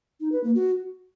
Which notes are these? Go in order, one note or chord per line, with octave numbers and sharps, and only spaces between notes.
D#4
B4
A#3
F#4